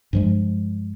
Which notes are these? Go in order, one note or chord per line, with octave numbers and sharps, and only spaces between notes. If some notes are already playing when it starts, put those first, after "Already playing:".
G2 F3 G#3